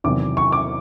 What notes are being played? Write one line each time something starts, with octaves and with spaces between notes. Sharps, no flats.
E2 C3 D#3 F#3 D6
C#6
D6